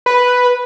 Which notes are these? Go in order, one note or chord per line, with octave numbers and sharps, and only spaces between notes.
B4